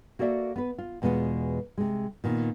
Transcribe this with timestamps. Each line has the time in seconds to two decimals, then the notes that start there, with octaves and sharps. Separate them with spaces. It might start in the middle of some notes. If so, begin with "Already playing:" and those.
0.19 A#3 F#4 A4 D5 E5
0.56 B3 B4
0.78 F4
1.02 E2 B2 G#3 F4 B4 F#5
1.78 C3 G#3
2.24 A#2 D#3 B3